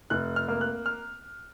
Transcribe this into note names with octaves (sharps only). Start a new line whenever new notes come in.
F1 F#6
F6
A#3
F#6
F6